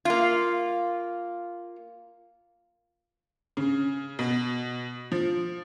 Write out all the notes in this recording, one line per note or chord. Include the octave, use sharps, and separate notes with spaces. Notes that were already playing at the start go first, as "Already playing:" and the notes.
A#3 F4
C#3
B2
F3